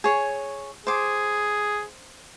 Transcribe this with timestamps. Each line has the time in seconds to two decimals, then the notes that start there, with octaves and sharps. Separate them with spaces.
0.04 G#4 C#5
0.87 G#4 C5 D6